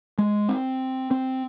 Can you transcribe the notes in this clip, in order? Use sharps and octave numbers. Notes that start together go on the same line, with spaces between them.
G#3
C4
C4